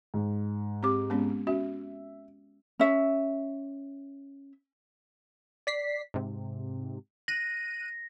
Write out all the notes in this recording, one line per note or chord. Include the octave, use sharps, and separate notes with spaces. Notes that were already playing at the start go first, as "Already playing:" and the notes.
G#2
C4 G4 D6
G#3 B3 C#4
C#4 F#4 E5
C#4 E5
D5 B6 C7
G#2 C3
F#6 A#6 D#7